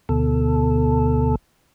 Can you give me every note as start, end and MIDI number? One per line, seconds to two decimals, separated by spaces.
0.09 1.35 38
0.09 1.35 47
0.09 1.35 69